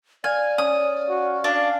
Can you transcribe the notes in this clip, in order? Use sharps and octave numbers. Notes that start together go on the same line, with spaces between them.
D5 F5 G#5
C#4 D#6
F#4
D4 F5